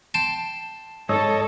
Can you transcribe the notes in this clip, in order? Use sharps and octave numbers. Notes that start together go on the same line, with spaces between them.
G5 A5 C6
G#2 A4 C#5 D#5 E6